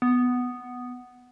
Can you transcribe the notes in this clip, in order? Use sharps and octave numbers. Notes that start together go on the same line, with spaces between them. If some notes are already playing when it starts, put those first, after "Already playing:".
B3